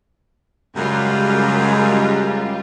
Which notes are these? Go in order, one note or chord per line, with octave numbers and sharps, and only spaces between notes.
F#2 C#3 G3 G#3 F4